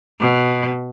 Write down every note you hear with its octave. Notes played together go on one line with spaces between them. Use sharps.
B2